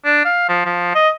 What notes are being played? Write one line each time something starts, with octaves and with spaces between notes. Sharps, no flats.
D4
F5
F3
F3
D#5